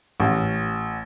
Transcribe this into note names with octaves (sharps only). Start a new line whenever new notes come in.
A1